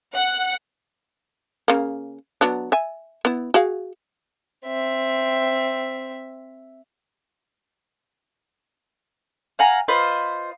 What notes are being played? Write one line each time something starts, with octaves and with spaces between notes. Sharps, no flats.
F#5
C#3 A#3
F#3 B3 D4
E5 G#5
B3 E4
F#4 G#4 F5
C4 E5
F5 F#5 G#5 A#5
F4 B4 C5 D#5